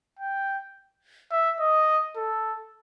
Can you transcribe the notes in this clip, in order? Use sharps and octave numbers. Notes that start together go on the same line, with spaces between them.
G5
E5
D#5
A4